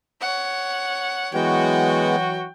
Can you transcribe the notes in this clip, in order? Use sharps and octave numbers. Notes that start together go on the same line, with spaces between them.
C#5 F#5
E3 F#3 G#3 B3 F#4 G5